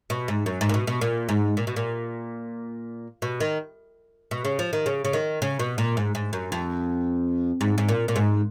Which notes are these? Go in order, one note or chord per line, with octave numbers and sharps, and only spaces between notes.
B2
G#2
F#2
G#2
A#2
B2
B2
A#2
G#2
A#2
B2
A#2
B2
D#3
B2
C#3
F3
D#3
C#3
C#3
D#3
C#3
B2
A#2
G#2
G#2
F#2
F2
G#2
G#2
A#2
A#2
G#2